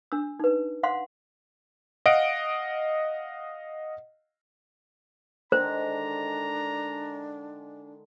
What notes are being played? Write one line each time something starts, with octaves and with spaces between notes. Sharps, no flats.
D4 E6
D#4 B4
F5 F#5 C6
D#5 F5 F#5 D7
D3 D#3 G#3 D4 C5 A#5